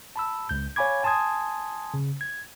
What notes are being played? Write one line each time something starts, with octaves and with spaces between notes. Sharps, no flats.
A5 B5 E6
C#2 G6
C#5 F5 G#5 B5 D6 G#6
G#5 A5 C6 D#6 G#6
C#3
G#6